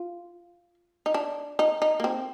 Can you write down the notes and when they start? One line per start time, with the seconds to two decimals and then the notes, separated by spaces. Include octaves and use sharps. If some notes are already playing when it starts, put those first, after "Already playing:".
Already playing: F4
1.06 D#4
1.14 D4
1.59 D#4
1.82 D#4
2.00 A#3
2.04 C4